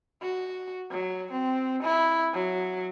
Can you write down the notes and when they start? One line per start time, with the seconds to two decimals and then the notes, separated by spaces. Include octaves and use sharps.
0.22 F#4
0.91 F#3
1.32 C4
1.83 E4
2.34 F#3